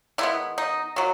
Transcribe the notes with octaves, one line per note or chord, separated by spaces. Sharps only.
D#3 G#3 B3 E4
D#4
D#3 F#3